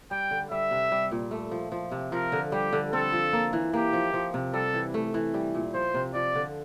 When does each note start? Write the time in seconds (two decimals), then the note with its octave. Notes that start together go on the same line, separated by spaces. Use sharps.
0.11 G3 G5
0.31 D3
0.51 G3 E5
0.71 C3
0.92 G3
1.11 A#2
1.31 A3
1.51 F3
1.72 F3
1.92 C3
2.12 F3 A#4
2.32 D3
2.52 G3 G4
2.73 D3
2.93 C4 A4
3.13 F3
3.33 A#3
3.53 E3
3.73 A#3 G4
3.93 F3
4.14 F3
4.34 C3
4.54 G3 A4
4.74 E3
4.94 A3
5.14 E3
5.34 G3
5.55 A#2
5.74 F3 C5
5.94 C3
6.14 F3 D5
6.35 D3